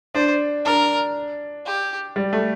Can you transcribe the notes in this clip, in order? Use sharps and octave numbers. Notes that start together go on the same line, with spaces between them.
D4 C5
D4 A#4
G4
G3
A3